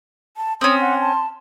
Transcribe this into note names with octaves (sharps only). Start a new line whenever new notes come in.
A5
C4 C#4 C6 D#6
F#5
A5